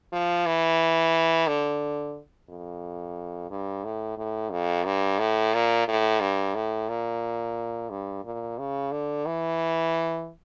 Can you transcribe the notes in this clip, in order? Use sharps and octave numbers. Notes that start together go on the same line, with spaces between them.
F3
E3
D3
F2
G2
A2
A2
F2
G2
A2
A#2
A2
G2
A2
A#2
G2
A#2
C#3
D3
E3